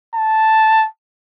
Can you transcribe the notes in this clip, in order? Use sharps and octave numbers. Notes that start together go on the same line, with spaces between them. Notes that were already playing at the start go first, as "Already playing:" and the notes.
A5